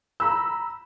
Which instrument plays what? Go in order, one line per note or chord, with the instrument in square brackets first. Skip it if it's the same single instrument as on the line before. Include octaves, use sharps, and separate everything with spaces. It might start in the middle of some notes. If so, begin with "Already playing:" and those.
[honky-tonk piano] A#5 B5 E6